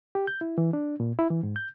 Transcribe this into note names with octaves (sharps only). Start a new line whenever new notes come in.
G4
G6
E4
E3
D4
A#2
E4
E3
G#2
G6